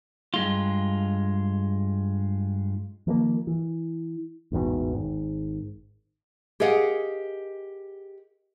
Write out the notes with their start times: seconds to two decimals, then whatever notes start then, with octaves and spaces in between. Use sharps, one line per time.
0.34 G2 G#3 F4
3.07 D#3 F3 G#3 A#3
3.47 E3
4.52 A1 E2 G#2 B2
4.93 G#1 G#2
6.60 G4 G#4 A#4 D#5 F5 F#5